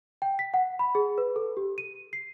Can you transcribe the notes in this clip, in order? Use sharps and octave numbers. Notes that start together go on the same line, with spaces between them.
G5
B6
F#5
B5
G#4
B4
A4
G4
D#7
C7